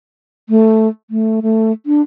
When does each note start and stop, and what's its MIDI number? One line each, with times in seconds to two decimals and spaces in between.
0.49 0.88 57
1.10 1.40 57
1.42 1.72 57
1.86 2.02 62